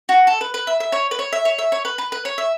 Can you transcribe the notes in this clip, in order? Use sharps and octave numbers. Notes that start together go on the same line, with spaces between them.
F#4
A4
B4
B4
E5
E5
C#5
B4
C#5
E5
C#5
E5
C#5
B4
B4
B4
C#5
E5